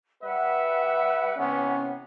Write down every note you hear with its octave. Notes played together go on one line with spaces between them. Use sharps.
G3 B4 E5 F#5
C3 E3 B3 C#4